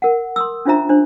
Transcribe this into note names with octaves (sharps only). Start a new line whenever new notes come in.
A#4 F#5
C6 D#6 E6
C#4 D4 F4 C5 E5 A#5
D4 C5